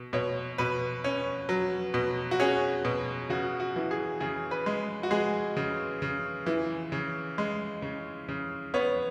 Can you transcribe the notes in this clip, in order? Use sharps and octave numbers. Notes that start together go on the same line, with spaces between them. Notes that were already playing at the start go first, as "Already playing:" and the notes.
Already playing: B2
B2 C#5
B2 B4
C#4
F#3
B2
F#4
C#4 G#4
B2
C#3 F#4
F#4
E3
G#4
C#3 G#4
B4
G#3
F#4
G#3 G#4
C#3
C#3
E3
C#3
G#3
C#3
C#3
B3 C#5